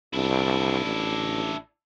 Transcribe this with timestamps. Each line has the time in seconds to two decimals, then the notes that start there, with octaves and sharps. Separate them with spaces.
0.13 C2 D4 E4
0.85 A1